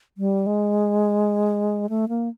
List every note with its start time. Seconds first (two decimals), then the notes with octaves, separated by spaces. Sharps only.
0.18 G3
0.46 G#3
1.89 A3
2.09 A#3